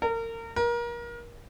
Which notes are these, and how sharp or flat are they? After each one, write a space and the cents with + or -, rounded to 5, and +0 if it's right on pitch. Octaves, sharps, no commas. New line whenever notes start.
A#4 -30
A#4 +30